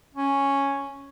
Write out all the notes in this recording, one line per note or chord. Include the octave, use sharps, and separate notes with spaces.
C#4